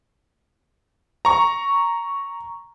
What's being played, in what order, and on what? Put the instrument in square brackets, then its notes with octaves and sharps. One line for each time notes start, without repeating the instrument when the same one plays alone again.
[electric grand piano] A#5 C#6